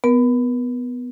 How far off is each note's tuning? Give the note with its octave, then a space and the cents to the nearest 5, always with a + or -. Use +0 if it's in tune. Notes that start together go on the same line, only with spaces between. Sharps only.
B3 +10 A#4 +40